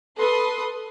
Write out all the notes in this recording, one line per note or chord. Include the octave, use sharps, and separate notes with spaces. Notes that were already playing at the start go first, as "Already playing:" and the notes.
A4 B4 C6 D#6